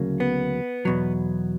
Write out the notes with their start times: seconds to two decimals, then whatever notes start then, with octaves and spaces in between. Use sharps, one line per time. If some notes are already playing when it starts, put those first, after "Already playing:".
Already playing: D2 C#3 F#3 A#3
0.20 B3
0.85 E2 B2 F#3